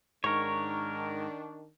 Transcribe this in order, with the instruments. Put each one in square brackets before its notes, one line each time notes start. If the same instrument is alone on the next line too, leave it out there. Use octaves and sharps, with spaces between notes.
[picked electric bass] G#2 [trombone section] D#3 D4 [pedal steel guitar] A#4 C#5 [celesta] C#6